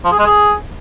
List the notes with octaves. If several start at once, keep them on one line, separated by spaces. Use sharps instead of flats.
F3
G#4
G#3
G#4